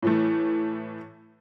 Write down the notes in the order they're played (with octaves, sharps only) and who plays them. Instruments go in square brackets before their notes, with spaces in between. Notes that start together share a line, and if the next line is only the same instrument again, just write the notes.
[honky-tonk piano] A2 E3 A3